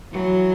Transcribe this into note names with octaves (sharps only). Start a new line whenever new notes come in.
E3 F#3